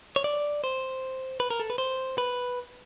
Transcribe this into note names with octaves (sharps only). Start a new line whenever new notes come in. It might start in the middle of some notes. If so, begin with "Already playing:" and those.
C#5
D5
C5
B4
A#4
A4
B4
C5
B4